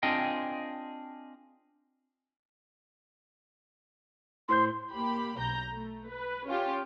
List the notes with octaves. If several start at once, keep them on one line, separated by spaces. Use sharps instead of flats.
C4 D4 F4 G#4 D#5 G5
A2 C5 C6 G6
A#3 G4 B5
B1 A#5 G6
A3
B4
C#4 F4 G4